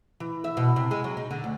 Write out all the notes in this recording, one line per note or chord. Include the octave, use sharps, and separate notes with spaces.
E3
E5
B2
C3
G#3
F#3
D#4
D3
D2